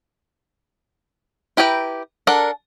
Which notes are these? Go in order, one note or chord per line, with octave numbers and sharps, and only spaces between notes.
E4 G4 B4 G5 A#5
D4 A4 A#4 D5 F#5